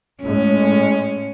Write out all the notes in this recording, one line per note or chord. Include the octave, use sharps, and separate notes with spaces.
A2 G#3 C#4